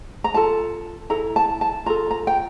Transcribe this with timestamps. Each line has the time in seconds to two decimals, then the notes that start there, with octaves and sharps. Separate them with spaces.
0.24 A#5
0.34 F4 A4 A5
1.10 E4 A4 A#5
1.36 A5
1.61 A5
1.86 F4 A#5
1.90 A4
2.11 A#5
2.27 G5